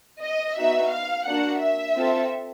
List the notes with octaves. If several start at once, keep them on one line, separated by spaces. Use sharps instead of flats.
D#5
B3 D#4 F#4 E5
F5
A#3 D4 F#4 F#5
E5
C4 F4 A4